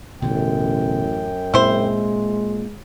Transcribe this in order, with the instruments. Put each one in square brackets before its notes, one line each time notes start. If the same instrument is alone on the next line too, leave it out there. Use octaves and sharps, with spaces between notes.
[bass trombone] A1 [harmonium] F#2 G5 [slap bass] B2 D3 F#3
[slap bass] A#2 C4 [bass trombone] G#3 [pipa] E4 C5